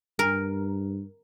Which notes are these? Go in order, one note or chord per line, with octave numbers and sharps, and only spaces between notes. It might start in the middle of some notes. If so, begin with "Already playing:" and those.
G2 A#4